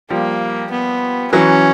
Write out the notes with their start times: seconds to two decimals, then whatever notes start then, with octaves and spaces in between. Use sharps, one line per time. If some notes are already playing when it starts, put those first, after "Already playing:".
0.10 F3 G3 A#3
0.72 B3
1.33 E3 F#3 C#4